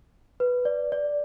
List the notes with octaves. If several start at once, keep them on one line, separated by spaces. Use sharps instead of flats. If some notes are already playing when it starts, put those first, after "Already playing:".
B4
D5
D5